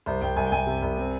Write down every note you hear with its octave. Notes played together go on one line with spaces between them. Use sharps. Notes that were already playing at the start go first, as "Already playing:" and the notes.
C2 C5
C2 G5
C2 G#5
G5
C2 G#5
C3
C2
C4